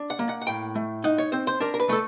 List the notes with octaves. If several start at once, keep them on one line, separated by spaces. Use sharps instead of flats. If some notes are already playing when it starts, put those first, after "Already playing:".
Already playing: D4
F#5
A#3
F#5
F#5
A2 G5
A3
D#4 F#5
C#5
C4 C5
C5
D4 A#4
A#4
B4
A3 A4